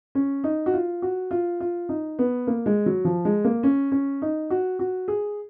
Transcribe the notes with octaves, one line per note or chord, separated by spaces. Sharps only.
C#4
D#4
F#4
F4
F#4
F4
F4
D#4
B3
A#3
G#3
F#3
F3
G#3
A#3
C#4
C#4
D#4
F#4
F#4
G#4